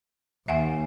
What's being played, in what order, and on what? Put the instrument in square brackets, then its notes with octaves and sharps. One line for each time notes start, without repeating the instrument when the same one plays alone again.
[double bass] D#2 [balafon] E5 F#5 G#5